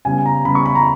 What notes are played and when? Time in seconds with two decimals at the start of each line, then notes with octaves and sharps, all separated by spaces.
0.05 C#3 G3 B3 G#5
0.26 A#5
0.45 C#3 G3 B3 B5
0.55 C#6
0.66 B5
0.75 A#5